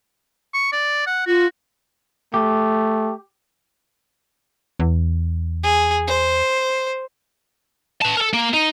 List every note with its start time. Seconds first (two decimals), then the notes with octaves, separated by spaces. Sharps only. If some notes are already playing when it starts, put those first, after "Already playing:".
0.54 C#6
0.73 D5
1.07 F#5
1.27 F4 F#4
2.34 A3 G4
4.79 E2
5.63 G#4
6.07 C5
8.02 B4 A5
8.17 A4 A#4
8.34 A#3
8.53 D#4